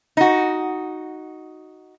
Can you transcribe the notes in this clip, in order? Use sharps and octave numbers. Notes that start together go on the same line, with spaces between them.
D#4 F#4